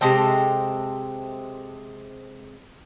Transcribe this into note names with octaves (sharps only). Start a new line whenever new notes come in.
C3 G#3 A4 G5